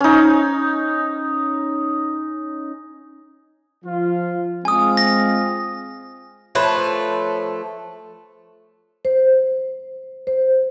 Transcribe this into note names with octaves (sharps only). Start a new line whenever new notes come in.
C#4 D#4
F3 F4
G#3 C4 F4 G#5 D#6
A#6
F3 A3 B4 C#5
C5
C5